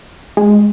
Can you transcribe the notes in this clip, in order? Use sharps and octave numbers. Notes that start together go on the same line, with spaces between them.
G#3